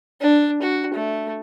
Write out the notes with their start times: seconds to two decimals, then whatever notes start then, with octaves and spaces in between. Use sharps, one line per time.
0.21 D4
0.62 F#4
0.94 A3